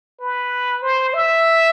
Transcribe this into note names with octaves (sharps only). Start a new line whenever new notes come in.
B4
C5
E5